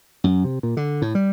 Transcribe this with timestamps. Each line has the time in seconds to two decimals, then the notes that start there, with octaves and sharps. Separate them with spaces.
0.24 F#2
0.44 C3
0.63 A#2
0.77 D3
1.02 A2
1.15 G3